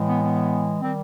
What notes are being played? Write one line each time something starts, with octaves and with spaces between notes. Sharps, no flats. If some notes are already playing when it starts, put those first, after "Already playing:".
Already playing: A2 E3 G#3
B3
B3
D#3 G3 C4